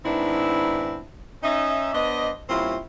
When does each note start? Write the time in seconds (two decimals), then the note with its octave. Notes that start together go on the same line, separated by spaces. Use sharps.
0.04 G#2 D#3 B3 C4 D4 E4
1.43 C#4 D#4 E5
1.93 B3 D4 C5 D5 D#5
2.49 A#2 G3 C4 C#4 E4 F4